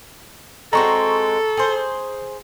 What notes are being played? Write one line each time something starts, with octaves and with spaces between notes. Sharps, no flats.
G#3 C4 F#4 A4 A#5 C#6
G#4 C5